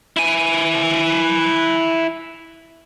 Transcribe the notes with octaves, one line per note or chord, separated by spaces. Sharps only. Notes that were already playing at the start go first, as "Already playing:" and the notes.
E4 G#5